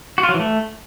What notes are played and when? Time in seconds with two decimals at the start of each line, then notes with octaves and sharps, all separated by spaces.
0.18 F#4
0.23 F4
0.29 F#3
0.34 E3
0.40 A3